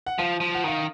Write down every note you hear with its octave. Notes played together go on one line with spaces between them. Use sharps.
F#5
F3 F5
F3
F#5
D#3 F5